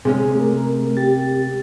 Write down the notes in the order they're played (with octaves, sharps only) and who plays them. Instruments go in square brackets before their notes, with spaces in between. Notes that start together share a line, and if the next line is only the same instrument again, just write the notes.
[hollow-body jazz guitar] C3 G#3 C#4 [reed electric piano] G#4
[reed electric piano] A3 A#4
G4 A6